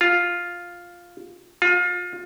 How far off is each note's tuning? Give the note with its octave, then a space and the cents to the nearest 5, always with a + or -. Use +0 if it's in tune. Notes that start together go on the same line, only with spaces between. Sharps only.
F4 +5
F4 +30